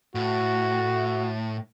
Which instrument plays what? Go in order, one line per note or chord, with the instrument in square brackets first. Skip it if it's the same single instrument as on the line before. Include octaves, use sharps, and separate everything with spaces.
[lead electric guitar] A2 [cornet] F#4